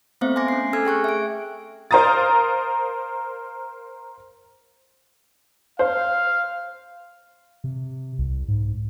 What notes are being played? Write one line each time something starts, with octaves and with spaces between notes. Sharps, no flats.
A3 B3 C4 C5 E5 F5
G#5 C6 D6 A#6
C#4 C7
A3 A4 G#5 E6 F6 G#6
G#4 G5 C#6 F#6
E5 D7
A#4 C5 F5 A#5 D#6 A6
C5 F5
C3
C2
G#2